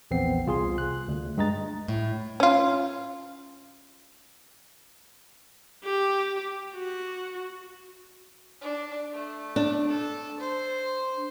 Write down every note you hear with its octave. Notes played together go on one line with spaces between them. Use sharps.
A#1 E2 B3 C4 C7
C2 F4 G#4 C6
F#6
D2
G2 G#3 D#5 A#5 A6
A2
C#4 F4
G4
F#4
D4
A3
D4
A4
C5